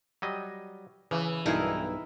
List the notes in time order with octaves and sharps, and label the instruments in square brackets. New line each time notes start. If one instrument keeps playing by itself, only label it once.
[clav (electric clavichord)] F#3 G3 D#5
[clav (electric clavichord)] C#3 [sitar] E3
[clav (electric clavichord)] B1 G2 G#4 [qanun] D#4 E4 A#4